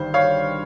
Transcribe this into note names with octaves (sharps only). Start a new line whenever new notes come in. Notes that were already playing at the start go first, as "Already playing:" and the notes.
Already playing: G1 G2 D#3 G3 C5
C#5 F5